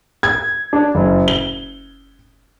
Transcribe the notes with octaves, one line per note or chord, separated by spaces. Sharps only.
G#6
D4
F#1
G7